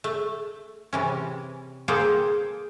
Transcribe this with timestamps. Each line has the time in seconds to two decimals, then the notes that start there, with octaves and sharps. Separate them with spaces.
0.04 A3
0.93 C3 E3 C#4
1.88 A#3 G#4 A4 C5 G5